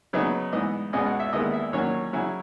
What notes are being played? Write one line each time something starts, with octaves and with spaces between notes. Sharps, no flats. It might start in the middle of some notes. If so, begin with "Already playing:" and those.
C#3 F#3 B3 D#4
G#2 E3 B3 D#5
C#2 B2 G#3 C#4 D#5
F#5
E5
D#2 D#3 G#3 B3 E4 D#5
E5
D#2 D#3 F#3 C#4 C#5
C#3 F#3 C#4 E4